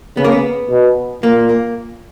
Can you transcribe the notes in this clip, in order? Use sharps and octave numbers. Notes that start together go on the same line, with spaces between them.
C#3 B3
A#3
B3
B2
A#2 A#3
A#3